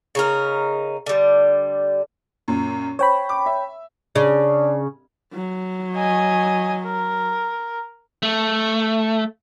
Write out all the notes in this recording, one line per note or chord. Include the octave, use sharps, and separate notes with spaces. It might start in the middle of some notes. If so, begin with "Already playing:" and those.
C#3 D#4 A#4
D3 G3
F#2 A#2
C5 C#5 G5 B5
D6
E5
C#3 D4
F#3
D#5 G#5
A#4
A3